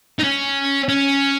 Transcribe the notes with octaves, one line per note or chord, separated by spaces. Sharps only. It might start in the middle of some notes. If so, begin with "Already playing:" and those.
D#4
C#4
C#4